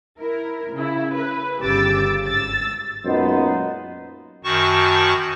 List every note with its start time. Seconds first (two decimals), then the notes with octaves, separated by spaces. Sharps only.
0.19 E4 A#4
0.74 C#3 E4
1.17 B4
1.62 G1 C#3 G4 D6 E6 A6
2.25 G#1 E6 A6
3.05 F#2 A#2 G#3 B3 D#4 C5
4.44 F#2 D#3 F#4 A5 C#6